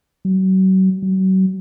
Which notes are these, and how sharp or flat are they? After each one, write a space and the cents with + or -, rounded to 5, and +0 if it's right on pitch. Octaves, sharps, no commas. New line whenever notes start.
F#3 +35
F#3 +35